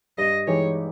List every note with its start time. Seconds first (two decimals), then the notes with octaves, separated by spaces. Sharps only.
0.18 G2 D#5
0.47 E3 G#3 D#4 G4 C#5